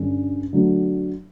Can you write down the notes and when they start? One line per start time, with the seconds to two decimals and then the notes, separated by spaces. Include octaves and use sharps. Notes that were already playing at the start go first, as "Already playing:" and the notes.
Already playing: G2 D3 G3 C#4
0.53 D3 F#3 A3